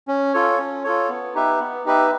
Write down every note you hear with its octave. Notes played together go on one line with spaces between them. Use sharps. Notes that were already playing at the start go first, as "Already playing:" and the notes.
C#4
F4 A4 C#5
C#4
F4 A4 C#5
B3
D#4 G4 B4 E5
B3
D#4 G4 B4 E5